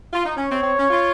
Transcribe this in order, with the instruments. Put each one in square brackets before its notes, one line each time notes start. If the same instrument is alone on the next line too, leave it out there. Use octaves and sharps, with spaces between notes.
[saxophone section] F4
D#4
[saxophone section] C#4 [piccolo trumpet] C#5
[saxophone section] C4
C4
C#4
F4